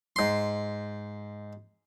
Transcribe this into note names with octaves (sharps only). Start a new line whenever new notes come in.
G#2 C6